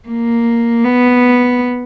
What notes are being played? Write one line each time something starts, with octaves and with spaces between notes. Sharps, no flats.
A#3
B3